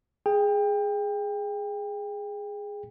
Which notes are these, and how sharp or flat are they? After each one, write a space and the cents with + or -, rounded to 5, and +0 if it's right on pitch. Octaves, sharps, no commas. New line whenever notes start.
G#4 +0 G5 +25